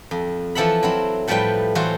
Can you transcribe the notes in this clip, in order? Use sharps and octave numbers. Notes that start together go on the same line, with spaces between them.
F2
E3 F3 A4 E5 F#5 B5
F#3 C4 E4
A2 F3 G3 A3 B4 G5
E3 F#3 A3 F4 F#4 C5